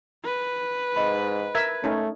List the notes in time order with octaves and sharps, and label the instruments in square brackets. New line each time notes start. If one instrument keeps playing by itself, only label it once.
[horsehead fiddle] B4
[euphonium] G#2 [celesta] D#5 B5
[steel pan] A#4 E5 [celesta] G#6
[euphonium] A3 [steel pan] C#4 D#4